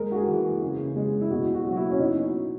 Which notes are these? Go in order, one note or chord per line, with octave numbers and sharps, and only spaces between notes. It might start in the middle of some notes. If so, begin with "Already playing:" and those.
Already playing: G#3 A#4
F#4
G#4
E3
C#3
G#3
E4
B2 F#4
F#4
F#3
F#4
E4
C#4
B2 D#4